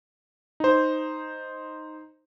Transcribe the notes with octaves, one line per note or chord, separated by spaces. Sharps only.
D#4 C5